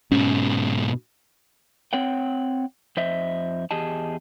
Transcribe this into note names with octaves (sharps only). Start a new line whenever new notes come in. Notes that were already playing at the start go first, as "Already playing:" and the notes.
G#2 B2 C#4
C4 C#5 F#5 G5
F2 C5 D#5 E5
E2 G4 G#4 D#5 A5